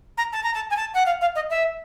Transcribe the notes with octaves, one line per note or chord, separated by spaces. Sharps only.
A#5
A5
A#5
A5
G#5
A5
F#5
F5
F5
D#5
E5